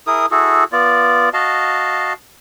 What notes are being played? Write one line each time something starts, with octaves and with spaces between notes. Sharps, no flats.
E4 G#4 A#4 D#6
E4 F#4 G#4 A4
B3 F4 D5
F#4 D#5 F5 A5